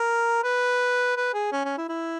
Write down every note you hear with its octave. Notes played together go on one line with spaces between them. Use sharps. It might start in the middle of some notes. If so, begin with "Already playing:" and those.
Already playing: A#4
B4
B4
G#4
C#4
C#4
E4
E4